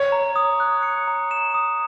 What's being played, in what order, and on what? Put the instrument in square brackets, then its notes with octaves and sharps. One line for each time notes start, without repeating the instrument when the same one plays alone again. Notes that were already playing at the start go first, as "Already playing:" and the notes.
Already playing: [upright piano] C#5
[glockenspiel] A#5
D#6
F#6
C#7
A#5
E7
D#6